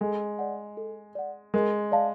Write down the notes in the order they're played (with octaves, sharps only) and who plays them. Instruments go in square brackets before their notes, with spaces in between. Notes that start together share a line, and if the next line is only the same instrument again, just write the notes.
[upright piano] G#3 [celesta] A4
[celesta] D5 F#5
A4
D5 F#5
[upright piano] G#3 [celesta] A#4
[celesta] D5 F5 A5